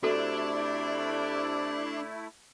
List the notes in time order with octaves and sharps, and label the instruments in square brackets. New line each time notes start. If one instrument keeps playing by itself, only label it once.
[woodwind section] C3 D5 [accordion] A3 E4 [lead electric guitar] D4 [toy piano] F#4 A4